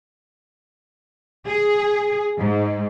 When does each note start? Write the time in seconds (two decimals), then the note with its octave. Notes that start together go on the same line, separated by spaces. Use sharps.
1.48 G#4
2.39 G#2